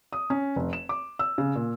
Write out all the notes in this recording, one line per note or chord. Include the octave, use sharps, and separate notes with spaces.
D#6
C#4
F1
E7
D6
E6
C#3
A#2